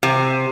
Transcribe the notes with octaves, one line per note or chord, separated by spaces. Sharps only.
C3